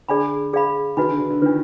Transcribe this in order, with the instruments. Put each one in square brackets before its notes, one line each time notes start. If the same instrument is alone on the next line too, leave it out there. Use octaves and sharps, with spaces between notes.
[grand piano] D3 [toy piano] G#4 D5 G#5 B5
[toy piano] G#4 D5 F5 B5
[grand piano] D#3 [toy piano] F#4 B4 D#5 G#5 B5
[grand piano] D3
D3
D3
[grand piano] D#3 [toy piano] D4 F4 B4